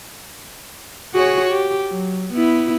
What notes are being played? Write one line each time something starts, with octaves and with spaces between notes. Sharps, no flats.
F#4 G#4 C#5
G4
F#3
B3 E4